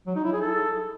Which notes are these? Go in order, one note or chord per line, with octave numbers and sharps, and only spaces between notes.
F#3
D#4
E4
G#4
A4